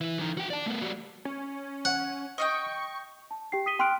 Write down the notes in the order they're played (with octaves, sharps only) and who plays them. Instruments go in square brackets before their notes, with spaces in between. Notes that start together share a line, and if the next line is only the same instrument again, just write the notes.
[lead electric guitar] E3 E4
E3 D#4
F#4 G5
D5 A5
A3 B3
G3 F#4
[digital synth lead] C#4
[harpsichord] F#5
[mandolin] D#5 F5 G5 [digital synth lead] C#6
[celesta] A5
G4 G5 C7
D#6 B6 D#7 G7
G5 C6 F6 F#6 D7